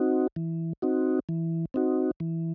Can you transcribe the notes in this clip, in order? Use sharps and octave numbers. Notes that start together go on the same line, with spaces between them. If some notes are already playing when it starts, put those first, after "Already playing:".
Already playing: C4 D#4 F#4
E3
C4 D#4 F#4
E3
C4 D#4 F#4
E3